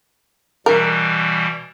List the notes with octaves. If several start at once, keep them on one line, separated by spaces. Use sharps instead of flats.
B2 E3 G3 A#4